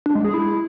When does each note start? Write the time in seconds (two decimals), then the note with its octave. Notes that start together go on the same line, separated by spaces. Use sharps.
0.06 D4
0.15 G#3
0.25 G#4
0.34 E4